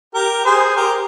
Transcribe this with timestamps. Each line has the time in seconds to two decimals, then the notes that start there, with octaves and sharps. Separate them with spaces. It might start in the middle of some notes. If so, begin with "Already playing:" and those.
0.14 G4 A#4
0.45 G#4 C5
0.76 G4 A#4